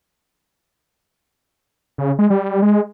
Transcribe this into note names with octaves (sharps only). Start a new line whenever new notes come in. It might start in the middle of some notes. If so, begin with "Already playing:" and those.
C#3
G#3
G3
G#3